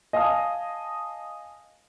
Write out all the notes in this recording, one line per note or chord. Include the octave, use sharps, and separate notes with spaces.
D#5 F5 G#5 A5 D#6